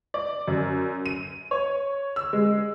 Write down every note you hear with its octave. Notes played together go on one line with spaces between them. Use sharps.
D5
F#2
D#7
C#5
E6
G#3